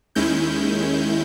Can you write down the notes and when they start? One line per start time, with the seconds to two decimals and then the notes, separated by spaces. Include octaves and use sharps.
0.15 D#2 D#3 G#3 C#4 E4 G6